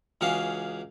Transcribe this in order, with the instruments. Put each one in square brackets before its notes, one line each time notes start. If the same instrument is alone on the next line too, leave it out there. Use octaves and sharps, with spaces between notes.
[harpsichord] C#2 E3 C#4 F#4 G#4 F5